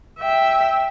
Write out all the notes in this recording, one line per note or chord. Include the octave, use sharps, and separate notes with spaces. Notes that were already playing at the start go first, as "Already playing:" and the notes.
E5 G5